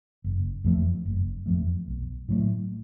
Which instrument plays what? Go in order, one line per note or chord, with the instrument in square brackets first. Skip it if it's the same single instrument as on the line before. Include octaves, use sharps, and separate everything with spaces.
[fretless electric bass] F#1
F2 F3 A3
F#1
F2 F3 A3
B1
A2 F#3 A3